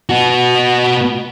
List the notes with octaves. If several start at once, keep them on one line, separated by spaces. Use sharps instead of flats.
B3 F#4